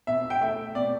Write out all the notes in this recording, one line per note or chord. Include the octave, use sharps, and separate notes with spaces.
B2 E5
G5
A3 E5
B2 D5